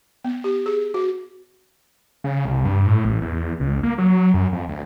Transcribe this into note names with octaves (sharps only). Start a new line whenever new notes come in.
B3
G4
G#4
F#4
C#3
C2
G2
A2
A1
E2
C#2
A#3
F#3
F#2
F2
D2